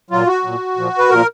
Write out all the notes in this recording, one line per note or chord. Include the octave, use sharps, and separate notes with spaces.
A#2 F#3 F4
F#4
A#2 F#3
A#2 F3
B4
A#2 F3 A#4